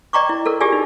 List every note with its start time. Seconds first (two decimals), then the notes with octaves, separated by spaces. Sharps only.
0.13 D5 D#5 G5 A#5 C#6 D6
0.29 E4
0.46 A4 A#4
0.60 F4 G4 G#4 D5 G#5
0.72 D#4